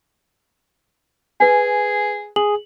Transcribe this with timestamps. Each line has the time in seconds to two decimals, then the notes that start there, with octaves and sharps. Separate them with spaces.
1.40 G#4 B4 G#5
2.36 G#4 F#7